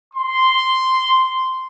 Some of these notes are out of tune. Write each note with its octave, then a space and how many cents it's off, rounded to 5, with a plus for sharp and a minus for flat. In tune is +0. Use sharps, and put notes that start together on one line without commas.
C6 -5